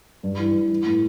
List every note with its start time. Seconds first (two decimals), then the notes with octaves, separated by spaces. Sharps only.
0.23 G2
0.39 E3
0.55 G2
0.70 E3
0.86 A2